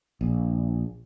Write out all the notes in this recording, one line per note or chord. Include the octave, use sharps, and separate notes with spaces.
A#1